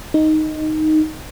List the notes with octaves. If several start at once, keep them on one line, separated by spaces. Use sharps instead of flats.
D#4